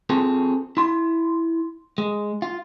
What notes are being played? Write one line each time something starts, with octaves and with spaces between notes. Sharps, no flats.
C4 F4 G#4 A4
E4 C6
G#3
F4